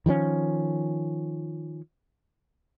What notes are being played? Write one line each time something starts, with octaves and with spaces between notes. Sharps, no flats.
D#3 F3 G3 C#4